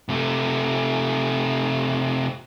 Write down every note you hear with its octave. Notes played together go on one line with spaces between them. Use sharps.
C3 A3